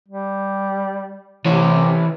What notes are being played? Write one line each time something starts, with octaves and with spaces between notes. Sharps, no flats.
G3
C3 E3 C#5